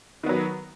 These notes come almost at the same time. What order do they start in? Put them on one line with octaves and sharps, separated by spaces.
D#3 B3 F#3